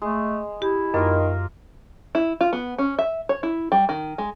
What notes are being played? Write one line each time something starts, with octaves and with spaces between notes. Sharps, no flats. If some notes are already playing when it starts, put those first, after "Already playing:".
G#3 A3
E4 G4
F#2 D#3 A#3 F4 A#4
E4
F4
B3
C#4
E5
C#5
E4
G3
D#3
G#3